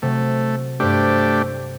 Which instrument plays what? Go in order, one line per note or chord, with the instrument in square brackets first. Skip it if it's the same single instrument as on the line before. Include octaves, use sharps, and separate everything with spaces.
[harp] C3 F#3 [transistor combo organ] A3
[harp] G2 C5 C7 [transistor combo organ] A3 D4 G4